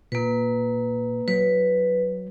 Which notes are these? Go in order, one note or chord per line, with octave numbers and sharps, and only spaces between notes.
A#2 A#3 B4
F#3 B4